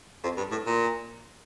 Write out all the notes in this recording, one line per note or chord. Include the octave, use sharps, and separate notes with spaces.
F2
G2
A2
A#2